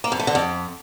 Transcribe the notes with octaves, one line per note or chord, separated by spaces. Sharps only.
A#3
F2
A3
D3
F2